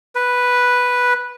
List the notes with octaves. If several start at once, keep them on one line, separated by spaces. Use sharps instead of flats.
B4